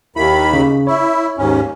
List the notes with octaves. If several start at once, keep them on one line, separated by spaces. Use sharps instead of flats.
D#2 D#3 E4 B5
C#3
E4 C#5
D#2 G#2 C#4